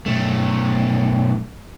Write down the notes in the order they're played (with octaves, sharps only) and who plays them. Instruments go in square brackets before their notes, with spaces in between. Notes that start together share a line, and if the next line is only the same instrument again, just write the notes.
[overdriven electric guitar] B1 A3